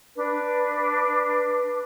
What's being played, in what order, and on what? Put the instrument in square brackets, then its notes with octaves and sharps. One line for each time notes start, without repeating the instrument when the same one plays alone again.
[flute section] D4 B4